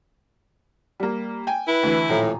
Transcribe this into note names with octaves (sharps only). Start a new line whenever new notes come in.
G3 A#3
G5 G#5
E4 B4
D2 E3
D#1 A2 F3 A#5